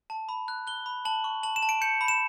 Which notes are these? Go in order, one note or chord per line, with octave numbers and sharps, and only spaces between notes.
A5
B5
F#6
F#6 G7
B5
A5 F#7
C#6
A5 F#7
E7
A5
D7
G6 C#7
B5
E7